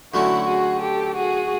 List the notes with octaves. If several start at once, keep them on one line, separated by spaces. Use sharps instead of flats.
D3 F#3 A3 C#4 E4 F#4
F#4 G#4
G4 A4
F#4 G#4